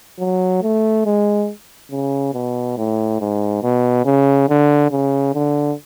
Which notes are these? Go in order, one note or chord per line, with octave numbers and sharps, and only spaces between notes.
F#3
A3
G#3
C#3
B2
A2
G#2
B2
C#3
D3
C#3
D3